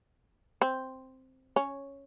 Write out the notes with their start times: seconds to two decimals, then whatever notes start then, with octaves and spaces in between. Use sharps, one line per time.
0.61 C4
1.56 C#4